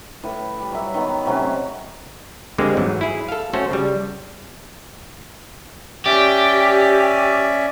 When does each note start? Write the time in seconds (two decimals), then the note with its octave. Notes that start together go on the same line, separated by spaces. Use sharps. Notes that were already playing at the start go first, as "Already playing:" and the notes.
0.24 A2 B4
0.60 G3
0.72 F#3 E5
0.94 D#3 B3
1.26 C3 F#3 A3 C#4
2.58 D3 G3 G#3 A#3 C4
2.77 G#2 E3 F#3 A3
3.01 E4 G#4
3.29 A4 F5
3.53 A3 C#4 F#4 A4 C5
3.71 C#3 G3
6.06 C#4 G4 D5 E5